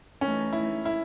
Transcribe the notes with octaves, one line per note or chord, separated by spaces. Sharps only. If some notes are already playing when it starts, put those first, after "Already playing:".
E3 A3 C#4 D#4
E4
E4